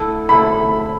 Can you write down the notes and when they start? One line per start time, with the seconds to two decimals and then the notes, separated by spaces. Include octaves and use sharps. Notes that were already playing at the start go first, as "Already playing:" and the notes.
Already playing: D3 A3 E4 A4
0.29 D3 A3 E4 A4 B5